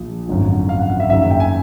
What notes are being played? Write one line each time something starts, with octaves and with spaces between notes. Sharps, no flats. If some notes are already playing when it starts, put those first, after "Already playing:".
Already playing: A#1 A#2 F3
G#1 F#2 D3 F3
F5
F#5
F5
E5
F#1 F#2 D#3 E5
G5
G#5